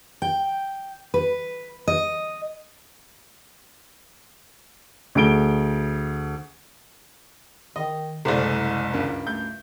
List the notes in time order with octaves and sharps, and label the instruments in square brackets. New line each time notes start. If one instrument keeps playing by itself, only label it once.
[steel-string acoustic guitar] G5
B4
D#5
[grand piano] D2 G#4 D7 G7
[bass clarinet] D#3 [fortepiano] D#5
[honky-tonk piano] F#1 C2 [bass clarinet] G#3 [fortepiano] A3 C5 D5
[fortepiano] C#2 G2 A#4
[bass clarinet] A3 [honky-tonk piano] G6